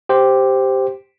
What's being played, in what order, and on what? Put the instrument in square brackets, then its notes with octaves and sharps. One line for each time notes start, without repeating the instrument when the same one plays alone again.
[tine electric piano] G4 C5